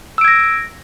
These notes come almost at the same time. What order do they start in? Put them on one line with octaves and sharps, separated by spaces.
E6 D7 G#6 A#6